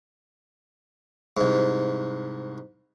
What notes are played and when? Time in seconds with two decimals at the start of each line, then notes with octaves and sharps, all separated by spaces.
1.37 C2 G#2